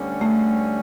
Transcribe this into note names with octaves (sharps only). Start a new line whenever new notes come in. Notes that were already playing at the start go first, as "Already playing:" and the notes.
Already playing: D2 D3 G3 C#4
A3